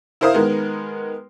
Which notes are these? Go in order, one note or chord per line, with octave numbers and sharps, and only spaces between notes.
E4 A#4 C5 F5 D#6
D#3 G#3 B3 A#4